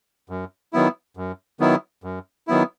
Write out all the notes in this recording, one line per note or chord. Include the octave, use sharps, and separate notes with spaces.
F#2
D#3 F#3 B3 E4
F#2
D#3 F#3 B3 E4
F#2
D#3 F#3 B3 E4